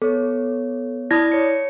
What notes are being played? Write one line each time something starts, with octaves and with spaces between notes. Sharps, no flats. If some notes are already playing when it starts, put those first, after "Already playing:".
B3 A4 C#5
E4 D5 B5 D#6 G#6 A#6
C#5 C#7